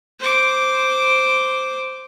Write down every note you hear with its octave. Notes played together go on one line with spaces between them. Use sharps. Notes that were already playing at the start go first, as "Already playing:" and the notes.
C5 D6